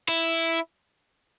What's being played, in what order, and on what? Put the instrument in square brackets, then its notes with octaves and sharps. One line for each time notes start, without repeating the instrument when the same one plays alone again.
[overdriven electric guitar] E4